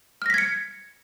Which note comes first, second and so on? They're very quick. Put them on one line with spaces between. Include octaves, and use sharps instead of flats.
F6 A#6 B6 G#6 C#7